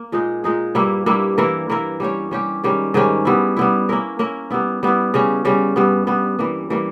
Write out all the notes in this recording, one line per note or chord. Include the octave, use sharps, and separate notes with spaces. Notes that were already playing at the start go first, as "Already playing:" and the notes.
Already playing: A#3
A#2 G#3 D#4 G#4
A#2 G#3 D#4 G#4
G2 G3 A#3 E4
G2 G3 A#3 E4
E3 A#3 E4 A#4
E3 A#3 E4 A#4
G3 C#4 G4 C#5
G3 C#4 G4 C#5
G#2 D#3 G3 C#4
G#2 D#3 G3 C#4
G3 B3 E4
G3 B3 E4
A#3 C#4 E4 A#4
A#3 C#4 E4 A#4
G3 B3 E4
G3 B3 E4
C#3 G3 C#4
C#3 G3 C#4
G2 G3 B3
G2 G3 B3
E3 G3 A#3
E3 G3 A#3